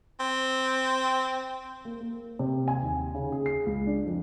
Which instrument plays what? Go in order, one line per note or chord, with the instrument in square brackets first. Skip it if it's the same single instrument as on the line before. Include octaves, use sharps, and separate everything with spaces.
[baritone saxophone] C4
[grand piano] A#3
A#3
C3
G#5
D#2
C#3
G#4
C7
C#2
D4
F2